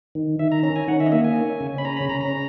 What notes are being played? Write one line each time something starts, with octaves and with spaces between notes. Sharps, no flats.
D#3
D#3 E5
A#5
C#4 A#5
G#5
D#3 F#5
E5
D#5
A#3 E5
G#5
C#4
C#3
B5
C#4 A#5
B5
C#3 A#5
A#5
C#4